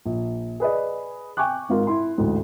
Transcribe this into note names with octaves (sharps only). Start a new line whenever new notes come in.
A#1
G#4 B4 D5 D#5
G5 G#5 C#6 D6 F#6
G#1 G#2 F4 A#4
E4 C6
A1 D2 G#2